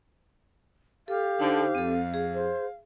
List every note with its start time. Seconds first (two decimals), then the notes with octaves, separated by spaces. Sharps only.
1.08 G4 A4 F5
1.40 D3 D#4 C5
1.75 F2 C4 A4
2.14 G#4
2.34 C5